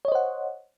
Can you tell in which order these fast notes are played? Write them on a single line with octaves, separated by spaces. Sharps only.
C#5 D#5 C5 F#5